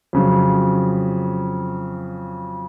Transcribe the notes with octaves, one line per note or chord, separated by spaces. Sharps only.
F2 C#3 F#3